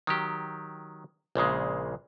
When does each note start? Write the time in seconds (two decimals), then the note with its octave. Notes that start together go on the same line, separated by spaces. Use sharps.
0.07 D#3 F#3 G4
1.35 A#1 A#2 C#3 G#3